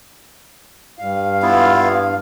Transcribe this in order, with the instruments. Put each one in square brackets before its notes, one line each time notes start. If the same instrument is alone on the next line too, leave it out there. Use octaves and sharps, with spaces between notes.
[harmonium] G2 F5
[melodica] B3 E4 F4